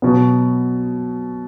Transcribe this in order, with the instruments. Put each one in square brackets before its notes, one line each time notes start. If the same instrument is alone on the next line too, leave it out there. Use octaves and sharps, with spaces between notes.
[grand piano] B2 F#3 B3